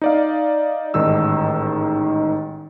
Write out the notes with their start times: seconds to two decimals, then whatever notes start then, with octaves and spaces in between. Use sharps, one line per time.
0.02 D#4 D5 F5
0.94 A1 G#2 D#3 D#4 E6